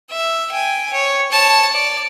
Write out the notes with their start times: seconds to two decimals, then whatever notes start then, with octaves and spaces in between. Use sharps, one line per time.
0.11 E5
0.52 G5 G#5
0.92 C#5
1.31 C#5 A5
1.72 D5